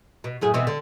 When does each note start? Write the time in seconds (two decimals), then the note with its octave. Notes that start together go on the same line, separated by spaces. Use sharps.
0.24 B2
0.41 F#2 A2 G#4
0.54 B2 E3 C4
0.67 D3